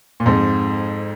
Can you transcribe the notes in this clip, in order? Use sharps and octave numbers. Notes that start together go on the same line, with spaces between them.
A#2
F2 G#2